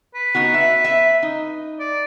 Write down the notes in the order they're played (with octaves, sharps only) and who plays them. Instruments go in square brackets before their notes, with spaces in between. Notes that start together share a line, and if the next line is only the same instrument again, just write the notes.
[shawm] B4
[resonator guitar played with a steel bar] B3 D#4 F#4
E5
E5
D#4
[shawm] D5